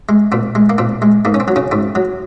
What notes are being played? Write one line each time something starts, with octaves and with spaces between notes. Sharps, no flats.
G#3
A#2 C4
G#3
A#3
A#2 C4
G#3
G#2 A#3
C#4
C4
F#3
C#3 C#4
G#2 C4
F#3